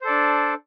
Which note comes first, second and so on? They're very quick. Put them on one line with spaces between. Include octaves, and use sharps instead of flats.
C5 A4 D5 D4